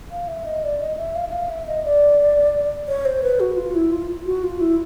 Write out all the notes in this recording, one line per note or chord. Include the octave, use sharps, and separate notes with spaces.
F5
E5
D#5
D5
D#5
E5
F5
E5
F5
E5
D#5
D5
C#5
C5
B4
F#4
F4
E4
F4
F#4
F4
E4